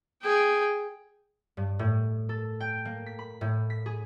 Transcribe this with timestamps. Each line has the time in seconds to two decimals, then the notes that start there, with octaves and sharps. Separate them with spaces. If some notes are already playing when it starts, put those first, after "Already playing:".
0.23 G#4 G5
1.57 G2
1.79 A2
2.29 A4
2.60 G5
2.85 A#3
3.06 B6
3.19 B5
3.41 A2
3.70 B6
3.86 G#4